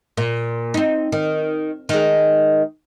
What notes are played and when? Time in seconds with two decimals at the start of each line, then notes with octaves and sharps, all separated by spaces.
0.17 A#2
0.74 C4 D#4
1.12 D#3
1.89 D#3 G#3